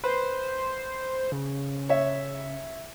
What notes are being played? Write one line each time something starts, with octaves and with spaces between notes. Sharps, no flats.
B4 C5
C#3
C#5 E5